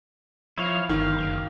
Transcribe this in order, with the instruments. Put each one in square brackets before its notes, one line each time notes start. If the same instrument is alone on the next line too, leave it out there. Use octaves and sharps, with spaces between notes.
[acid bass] F3 [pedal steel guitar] E4 C#5 F5
[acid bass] G1 [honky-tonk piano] D#3 [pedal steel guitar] F5
[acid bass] F#1